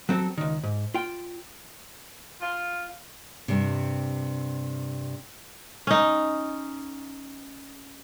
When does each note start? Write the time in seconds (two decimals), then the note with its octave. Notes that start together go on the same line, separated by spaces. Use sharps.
0.09 F#3 C4 A4
0.38 C#2 D#3
0.63 G#2
0.94 F4 G5
2.41 F4
3.48 G2 C3
5.87 C#4 D#4